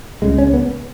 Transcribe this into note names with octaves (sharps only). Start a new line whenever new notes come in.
C#2 C#3 G#3
C#4
B3